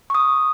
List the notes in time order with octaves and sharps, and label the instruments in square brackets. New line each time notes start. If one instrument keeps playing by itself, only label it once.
[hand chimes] C#6
D#6